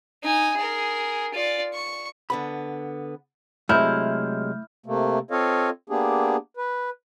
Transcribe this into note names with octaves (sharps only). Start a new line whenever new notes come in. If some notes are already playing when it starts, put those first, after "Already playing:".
D#4 G#5
G#4 A#4
F4 D5
C#6
D3 B3 B5
C3 F#3 G#3 A3 E4 F6 G6
C3 A3 A#3
C4 F4 A4 C#5 D#5 F5
A#3 B3 D4 G4 G#4
B4